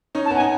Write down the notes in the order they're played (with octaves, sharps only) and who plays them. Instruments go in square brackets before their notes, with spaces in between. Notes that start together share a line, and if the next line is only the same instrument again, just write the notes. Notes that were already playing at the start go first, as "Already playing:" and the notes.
[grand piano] C#4 D#4
[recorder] A5
[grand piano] B3 C#4
[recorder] G#5
[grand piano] D#4